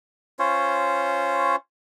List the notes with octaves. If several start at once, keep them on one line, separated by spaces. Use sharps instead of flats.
C#4 F4 C5 C#5